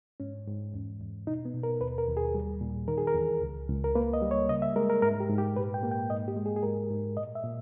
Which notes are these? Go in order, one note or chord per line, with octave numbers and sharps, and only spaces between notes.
G#2 C#4
G#2
E2
E2
B2 D#4
B3
B2
A#4
D#2 B4
A#4
D#2
G#4
G3
A#2
D#3 A#4
G#4
A#4
E2
C#2
C#2
A#4
A#3 B4
D#5
G3
C#5
C#3 D#5
E5
G#3 A#4
A#4
G#2 A#4
G4
G#2
G4
A#2 B4
G5
A#3
G5
G#2 D#5
G4
G#3
G#4
G#4
G#2 A#4
G#2
A#2 D#5
E5
A#2